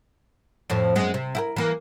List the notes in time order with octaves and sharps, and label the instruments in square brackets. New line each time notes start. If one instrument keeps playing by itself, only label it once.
[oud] F2 A2 F3
F#2 G#3 B3
C3
E4 G4 A#4
E3 A#3